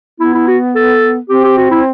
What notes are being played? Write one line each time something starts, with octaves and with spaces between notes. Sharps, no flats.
B3 E4
E4
F#4
A4
C4 G4
G4
F#4
E4